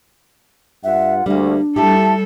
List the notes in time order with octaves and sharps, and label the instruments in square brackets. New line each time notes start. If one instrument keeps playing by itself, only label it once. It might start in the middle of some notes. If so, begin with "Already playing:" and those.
[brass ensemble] G2 F4 F#5 [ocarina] E5
[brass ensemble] D2 [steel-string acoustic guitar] G3 A#3 [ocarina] D4
[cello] G3 A4 [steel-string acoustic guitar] A3 E4 G4 [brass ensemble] A5